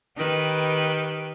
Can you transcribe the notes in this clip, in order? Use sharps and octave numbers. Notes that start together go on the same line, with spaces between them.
D#3 G4 B4